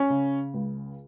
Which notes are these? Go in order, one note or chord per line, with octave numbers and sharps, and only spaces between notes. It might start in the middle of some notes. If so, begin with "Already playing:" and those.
Already playing: C#4
C#3
C#2